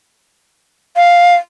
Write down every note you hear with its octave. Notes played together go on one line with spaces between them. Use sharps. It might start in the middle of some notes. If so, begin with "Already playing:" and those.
F5